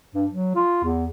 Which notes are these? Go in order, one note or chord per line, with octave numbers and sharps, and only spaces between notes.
G2
F#3
F4
E2